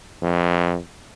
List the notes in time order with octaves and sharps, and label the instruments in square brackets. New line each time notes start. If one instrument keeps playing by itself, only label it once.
[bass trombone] F2